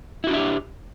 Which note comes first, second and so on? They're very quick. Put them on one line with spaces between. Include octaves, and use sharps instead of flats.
E4 F#4 D4 E5 G4